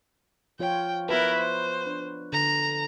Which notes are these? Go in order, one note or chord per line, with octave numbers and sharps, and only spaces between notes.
F3 F4 C#5 G5
B3 E4 F#4 A#4 B4
C5
D4
D3 A#5